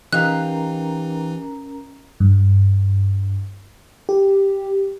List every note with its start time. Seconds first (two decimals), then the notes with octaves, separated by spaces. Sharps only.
0.13 E3 C#4 D#4 G4 A#4 F5 A#5 F#6
2.20 G2
4.09 G4